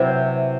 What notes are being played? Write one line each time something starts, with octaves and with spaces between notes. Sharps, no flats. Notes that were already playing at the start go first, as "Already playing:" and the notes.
Already playing: C3 F#3 C4 E4 G4 B4